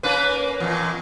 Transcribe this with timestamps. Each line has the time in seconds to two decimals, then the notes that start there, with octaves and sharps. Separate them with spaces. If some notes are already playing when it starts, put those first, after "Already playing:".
0.03 A#3 C#4 B4
0.60 E2 A#2